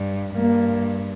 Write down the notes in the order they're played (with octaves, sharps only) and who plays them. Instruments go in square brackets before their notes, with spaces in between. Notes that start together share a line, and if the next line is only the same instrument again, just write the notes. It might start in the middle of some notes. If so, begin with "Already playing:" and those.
Already playing: [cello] G2
[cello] G2 [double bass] A#3